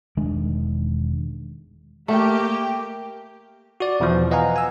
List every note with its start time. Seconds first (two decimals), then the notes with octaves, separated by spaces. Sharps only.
0.17 E1 D#3 G#3 D4
2.08 A3 A#3 G4
3.80 F#4 D5
4.00 E2 B2 E3 F3
4.31 B4 D#5 F5 F#5 G#5 A#5
4.56 G#5 E6